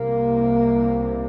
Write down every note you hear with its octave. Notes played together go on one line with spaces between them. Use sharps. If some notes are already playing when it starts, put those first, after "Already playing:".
Already playing: C2 C3 A#3